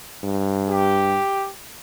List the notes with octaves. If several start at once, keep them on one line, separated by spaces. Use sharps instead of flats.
G2
G4